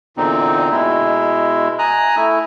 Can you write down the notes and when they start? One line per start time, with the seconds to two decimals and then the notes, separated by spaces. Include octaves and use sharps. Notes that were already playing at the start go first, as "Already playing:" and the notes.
0.17 E2 A#2 D3 C4 D#4
0.71 B2 G#3 E4
1.79 G#5 A#5 D#6 F#6
2.16 A3 E4